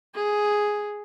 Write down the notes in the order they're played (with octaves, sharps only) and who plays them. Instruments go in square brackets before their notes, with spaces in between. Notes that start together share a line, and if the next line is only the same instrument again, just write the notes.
[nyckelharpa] G#4